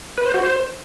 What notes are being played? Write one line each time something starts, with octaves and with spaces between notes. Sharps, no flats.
B4
C5
F#4
C5